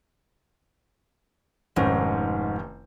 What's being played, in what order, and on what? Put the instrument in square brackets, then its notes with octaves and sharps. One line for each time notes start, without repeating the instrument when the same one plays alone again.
[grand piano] F1 D#3 C#4 [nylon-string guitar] G#2